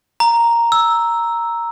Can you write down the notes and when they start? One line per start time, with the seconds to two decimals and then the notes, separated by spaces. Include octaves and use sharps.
0.20 A#5
0.72 E6